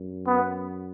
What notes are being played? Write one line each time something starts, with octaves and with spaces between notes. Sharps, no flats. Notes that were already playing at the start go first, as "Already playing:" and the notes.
Already playing: F#2
B3